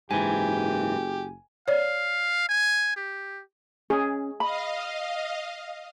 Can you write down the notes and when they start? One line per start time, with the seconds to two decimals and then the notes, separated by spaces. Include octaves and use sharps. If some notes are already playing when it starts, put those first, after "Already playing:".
0.11 F#1 G#2 E3 G4 G#5
1.68 C#5 D5 F5
2.49 G#5
2.96 G4
3.90 C#4 G#4
4.40 D#5 F5 B5